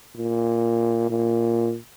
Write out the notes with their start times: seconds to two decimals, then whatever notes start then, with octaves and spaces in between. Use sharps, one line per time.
0.16 A#2
1.10 A#2